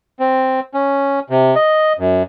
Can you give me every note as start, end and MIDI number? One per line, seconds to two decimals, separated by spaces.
0.20 0.60 60
0.74 1.20 61
1.30 1.55 48
1.55 1.93 75
1.99 2.23 42